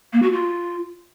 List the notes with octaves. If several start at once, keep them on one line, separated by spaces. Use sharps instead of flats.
A#3
F#4
F4